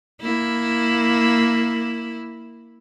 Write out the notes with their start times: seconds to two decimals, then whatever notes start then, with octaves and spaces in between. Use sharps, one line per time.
0.21 A#3 E4